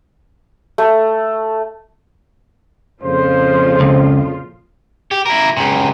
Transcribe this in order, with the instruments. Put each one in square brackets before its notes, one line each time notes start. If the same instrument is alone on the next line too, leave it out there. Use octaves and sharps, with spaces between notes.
[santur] A3
[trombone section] F2 A#2 C#3 [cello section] F3 F4 [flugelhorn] C5
[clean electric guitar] C#2
[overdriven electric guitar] G4
E4 A#4
C#2 A#2